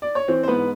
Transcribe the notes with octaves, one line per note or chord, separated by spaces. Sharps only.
D5
C#5
E3 C4 C5
C5
G#2 B3 B4